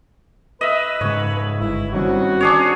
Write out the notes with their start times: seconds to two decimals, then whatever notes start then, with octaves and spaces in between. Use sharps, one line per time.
0.61 B4 D#5 E5
1.01 G#2 C#3 G#3 C#5
1.60 G1 E4
1.94 D#3 G3 C4 C#4 F#4
2.41 D4 G#4 C#5